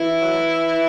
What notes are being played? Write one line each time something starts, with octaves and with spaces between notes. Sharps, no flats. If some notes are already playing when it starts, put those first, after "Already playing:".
Already playing: E3 E4
F#3 A3